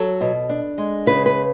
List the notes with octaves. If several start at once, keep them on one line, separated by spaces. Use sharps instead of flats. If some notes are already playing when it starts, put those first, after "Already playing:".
Already playing: F#3 A4
B2
D4
G#3
C#3 B4
B4